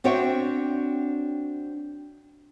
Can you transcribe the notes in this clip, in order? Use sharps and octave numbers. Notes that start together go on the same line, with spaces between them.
C4 D4 F#4 C#5 E5 G5